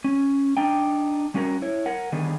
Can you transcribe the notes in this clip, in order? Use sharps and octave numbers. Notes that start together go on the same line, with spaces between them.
C#4
D4 D#4 G5
G3 C#4 F#4 G#4 A#4
E4 C#5
A#4 F#5
D3 D#3 G3 B3 G#4